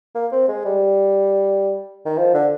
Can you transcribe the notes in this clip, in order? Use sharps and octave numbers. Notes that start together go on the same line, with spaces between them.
A#3
C4
G#3
G3
D#3
F3
D3